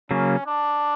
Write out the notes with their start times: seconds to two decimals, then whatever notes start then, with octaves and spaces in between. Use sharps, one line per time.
0.11 C#3 F#3 A#3 C#4
0.46 D4